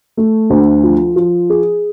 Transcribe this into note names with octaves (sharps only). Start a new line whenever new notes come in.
A3
D2
F3
F3
G#4